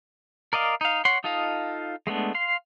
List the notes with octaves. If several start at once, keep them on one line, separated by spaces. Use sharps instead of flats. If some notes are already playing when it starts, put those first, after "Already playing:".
A#4 D5 D#5 F5
D#4 F5
C#5 F#5 C6
D#4 F4 A4 D#5 F5
G#3 A3 B3 D4
F5 C6